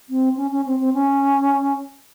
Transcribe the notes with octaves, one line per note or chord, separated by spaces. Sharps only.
C4
C#4
C#4
C4
C4
C#4